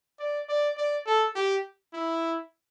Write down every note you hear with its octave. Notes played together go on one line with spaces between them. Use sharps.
D5
D5
D5
A4
G4
E4